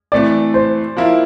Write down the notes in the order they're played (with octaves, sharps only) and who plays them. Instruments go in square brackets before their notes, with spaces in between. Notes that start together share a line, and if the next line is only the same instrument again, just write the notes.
[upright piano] E3 A3 C4 [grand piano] D5
[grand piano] C5
[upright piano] F3 A#3 E4 A#4